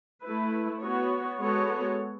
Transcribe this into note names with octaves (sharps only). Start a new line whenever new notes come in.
A3 E4 B4
B3 F#4 C#5
G#3 B3 F#4 A4 C#5